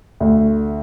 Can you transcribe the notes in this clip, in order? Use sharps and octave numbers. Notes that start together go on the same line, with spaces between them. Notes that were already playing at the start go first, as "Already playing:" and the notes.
D2